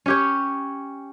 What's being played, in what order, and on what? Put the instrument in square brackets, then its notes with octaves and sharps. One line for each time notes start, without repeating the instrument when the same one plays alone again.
[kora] C#4 G4 C#5